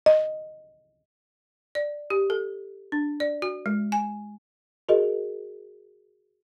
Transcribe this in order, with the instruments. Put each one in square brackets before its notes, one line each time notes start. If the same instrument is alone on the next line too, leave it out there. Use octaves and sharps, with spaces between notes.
[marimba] D#5
[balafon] D5
G4
A4
D4
D5
F#4
G#3
G#5
[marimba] F#4 G#4 A#4 D#5